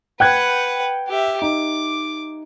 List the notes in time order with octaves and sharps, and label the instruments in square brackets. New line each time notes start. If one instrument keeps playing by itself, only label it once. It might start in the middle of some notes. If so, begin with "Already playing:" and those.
[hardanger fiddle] B4 F#5 [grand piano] G5 F#6 G#6
[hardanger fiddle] G4 E5
[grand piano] D#4 [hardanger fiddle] D6